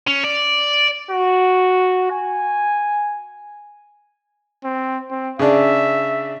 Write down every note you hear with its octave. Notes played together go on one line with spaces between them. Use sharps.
C#4
D5
F#4
G#5
C4
C4
C#3 D4 E5